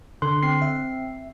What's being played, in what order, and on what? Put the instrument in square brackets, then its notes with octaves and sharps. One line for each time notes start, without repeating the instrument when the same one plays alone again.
[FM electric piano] D3 A4 F#6 [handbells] C6
[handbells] C4 C7
[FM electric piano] E5